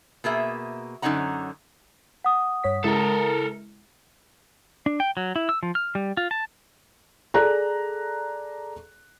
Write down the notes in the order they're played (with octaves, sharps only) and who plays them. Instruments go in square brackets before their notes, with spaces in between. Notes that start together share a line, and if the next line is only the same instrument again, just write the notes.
[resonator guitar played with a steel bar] B2 A#3 G#4 E5
F#2 D3 C#4 D#4 F#5 A#5
[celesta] F#5 D#6
[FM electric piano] G2 C#5 B6
[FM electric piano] C#3 G#3 E4 [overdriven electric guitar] A4 A#4
[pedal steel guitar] D4
G5
F#3
E4
E6
F3
F6
G3
F4
A5
[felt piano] G#4 A4 D5 A#5 F#6